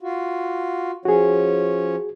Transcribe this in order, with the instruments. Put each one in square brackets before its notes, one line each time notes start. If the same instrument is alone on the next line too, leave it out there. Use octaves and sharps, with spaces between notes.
[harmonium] F4 F#4
[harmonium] F3 C#4 C#5 [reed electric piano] F#4 G#4